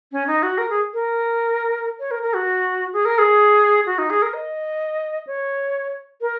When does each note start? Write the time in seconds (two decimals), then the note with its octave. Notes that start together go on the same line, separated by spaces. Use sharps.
0.12 C#4
0.27 D#4
0.43 F#4
0.58 A#4
0.70 G#4
0.94 A#4
2.00 C#5
2.11 A#4
2.23 A#4
2.34 F#4
2.93 G#4
3.05 A#4
3.18 G#4
3.86 F#4
3.98 D#4
4.10 G#4
4.22 A#4
4.34 D#5
5.27 C#5
6.21 A#4